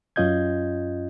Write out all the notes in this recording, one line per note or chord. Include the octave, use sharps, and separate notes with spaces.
F#2 C#4 F4 D#5 G6 G#6